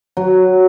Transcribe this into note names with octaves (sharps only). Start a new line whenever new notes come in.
F#3